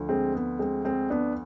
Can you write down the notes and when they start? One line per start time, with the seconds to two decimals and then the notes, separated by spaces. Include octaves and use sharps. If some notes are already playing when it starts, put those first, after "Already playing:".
Already playing: D2 D3 F3
0.09 G#3 C4
0.35 B3
0.59 G#3 C4
0.85 G#3 C4
1.10 B3 D4